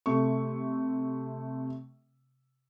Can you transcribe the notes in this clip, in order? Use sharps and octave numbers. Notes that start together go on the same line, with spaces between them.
C3 A3 C#6